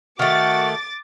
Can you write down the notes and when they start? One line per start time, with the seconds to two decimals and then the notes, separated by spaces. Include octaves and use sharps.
0.19 D#3 A3 F#4 D6 A6